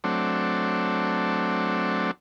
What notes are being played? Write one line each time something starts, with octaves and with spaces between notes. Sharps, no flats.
F#3 A3 C4 D4